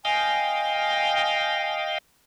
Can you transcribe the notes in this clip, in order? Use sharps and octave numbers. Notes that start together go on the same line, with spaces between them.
D#5 F5 G5 G#5